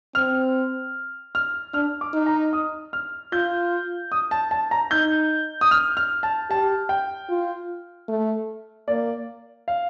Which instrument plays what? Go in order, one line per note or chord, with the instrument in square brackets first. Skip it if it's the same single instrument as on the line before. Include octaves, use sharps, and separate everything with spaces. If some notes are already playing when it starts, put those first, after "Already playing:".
[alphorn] C4 [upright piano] F6
[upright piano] F6
[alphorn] D4 [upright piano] F6
[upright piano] D6
[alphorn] D#4
[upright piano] A#5
D#6
F6
[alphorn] F4 [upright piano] G6
[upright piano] D#6
A5
A5
A#5
[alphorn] D#4 [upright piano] G6
[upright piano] D#6
F6
F6
A5
[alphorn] G4 [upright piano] A5
[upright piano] G5
[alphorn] F4
A3
[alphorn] A#3 [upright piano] D5
[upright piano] F5